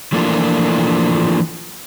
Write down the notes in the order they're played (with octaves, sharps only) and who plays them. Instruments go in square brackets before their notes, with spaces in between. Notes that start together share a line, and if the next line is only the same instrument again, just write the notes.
[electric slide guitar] E3 F3 A3 A#3 D4 F4